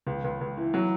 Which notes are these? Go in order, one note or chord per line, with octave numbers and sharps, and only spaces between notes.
C#2
C#2
C#2
E3
F#3